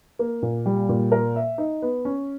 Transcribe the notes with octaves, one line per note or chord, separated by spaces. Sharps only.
A#3
A#2
G3
A#2
A#4
E5
D#4
B3
C#4